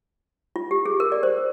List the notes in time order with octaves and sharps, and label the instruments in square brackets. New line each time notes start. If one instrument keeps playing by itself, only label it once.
[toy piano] F4
G4
G#4
A#4
D5
C5